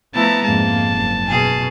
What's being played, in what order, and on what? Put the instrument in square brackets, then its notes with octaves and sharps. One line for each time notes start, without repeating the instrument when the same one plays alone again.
[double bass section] F3 [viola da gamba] A3 B3 E4 [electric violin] A5 A#5
[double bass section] F2 G#2 G#3 [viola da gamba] A#3 [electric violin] A5
[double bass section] F#1
[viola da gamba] B2 G#4